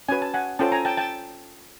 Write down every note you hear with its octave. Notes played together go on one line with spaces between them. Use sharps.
C#4 F#4 B4 G#5
A5
F#5 G#5
C#4 F4 A4 C5 G5 A5
G#5 A#5
G5 A5
G5 A5